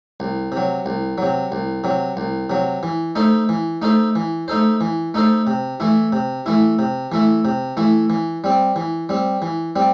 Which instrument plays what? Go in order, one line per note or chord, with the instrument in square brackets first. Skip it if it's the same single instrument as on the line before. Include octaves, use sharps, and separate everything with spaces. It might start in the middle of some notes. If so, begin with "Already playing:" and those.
[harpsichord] C2
C3
F#3
C2
C3 F#3
C2
C3 F#3
C2
C3 F#3
E3
A3 D#4 A4 C5
E3
A3 D#4 A4 C5
E3
A3 D#4 A4 C5
E3
A3 D#4 A4 C5
C3
E3 A3 E4
C3
E3 A3 E4
C3
E3 A3 E4
C3
E3 A3 E4
E3
G3 C4
E3
G3 C4
E3
G3 C4